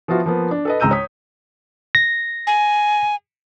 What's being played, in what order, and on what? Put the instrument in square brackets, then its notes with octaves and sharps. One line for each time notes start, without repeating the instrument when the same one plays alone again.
[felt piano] F3 B3 F4 F#4 E5
F3 A#3 B3
D4
A4 B4 D#5
C#2 G#3 A#5 E6 G6 D#7
C#5 D#6 B6
[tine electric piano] A#6
[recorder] G#5